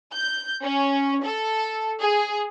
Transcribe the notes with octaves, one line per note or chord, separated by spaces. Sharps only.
G6
C#4
A4
G#4